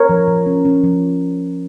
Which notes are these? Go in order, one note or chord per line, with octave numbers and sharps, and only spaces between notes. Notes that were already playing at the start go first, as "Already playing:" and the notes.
Already playing: A#4 C#5
F3
F3
C#4
C#4
F3